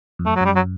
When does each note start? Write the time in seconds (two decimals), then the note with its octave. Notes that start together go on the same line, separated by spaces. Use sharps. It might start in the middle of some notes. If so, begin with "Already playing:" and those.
0.19 F2
0.25 F#2 A3
0.36 F#3
0.41 F#2
0.45 G3
0.55 F#3